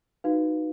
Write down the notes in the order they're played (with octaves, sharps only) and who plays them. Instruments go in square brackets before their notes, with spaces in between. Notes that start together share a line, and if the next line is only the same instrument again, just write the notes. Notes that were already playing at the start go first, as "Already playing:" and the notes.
[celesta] D#4 F#4 B4 F5